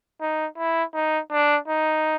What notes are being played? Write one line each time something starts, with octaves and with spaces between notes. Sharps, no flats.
D#4
E4
D#4
D4
D#4